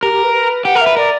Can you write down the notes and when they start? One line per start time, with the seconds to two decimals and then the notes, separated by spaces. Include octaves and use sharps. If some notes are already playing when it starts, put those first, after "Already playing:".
0.03 G4 A#4
0.13 G4
0.24 B4
0.34 B4
0.65 G4 F#5
0.75 A#4
0.81 E5
0.87 B4
0.97 A#4 D5